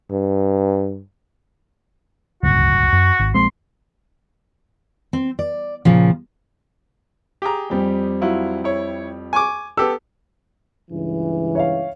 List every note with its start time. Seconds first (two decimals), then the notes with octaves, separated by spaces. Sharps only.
0.11 G2
2.43 D1 G1 C#2 F#4
2.93 F#2
3.19 G#1
3.35 A#1 G#3 C4 C6
5.13 C4
5.39 D5
5.85 A#2 C#3 F3
7.42 G4 G#4 A#5
7.70 F2 G3 C4
8.21 F#3 E4 F4
8.64 E4 C#5
9.33 G#5 C#6 D6
9.77 B3 G4 A4 E6
10.89 C#2 G2 E3
11.55 C#5 E5 F5